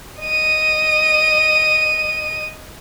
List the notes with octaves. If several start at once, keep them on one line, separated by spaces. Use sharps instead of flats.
D#5 D#7